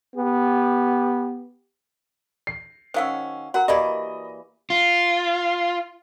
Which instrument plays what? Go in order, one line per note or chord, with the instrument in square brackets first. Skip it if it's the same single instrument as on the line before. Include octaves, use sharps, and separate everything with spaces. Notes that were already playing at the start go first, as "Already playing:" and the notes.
[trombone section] B3 G4
[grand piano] C7
[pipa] D#3 F#3 C#4 [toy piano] C5 F5 E6
[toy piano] F#4 A#4 A#5 [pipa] F#5
[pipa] E3 A#3 D5 [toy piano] G4 B5 [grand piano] D#5
[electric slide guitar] F4